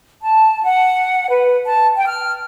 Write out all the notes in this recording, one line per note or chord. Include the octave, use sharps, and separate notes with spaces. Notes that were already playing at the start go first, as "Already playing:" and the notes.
A5
F#5
B4
A5
G5
F6